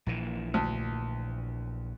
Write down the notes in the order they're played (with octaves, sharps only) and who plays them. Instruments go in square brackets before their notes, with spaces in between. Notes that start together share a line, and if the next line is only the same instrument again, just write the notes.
[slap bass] A#1 A#2 E3
[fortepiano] D2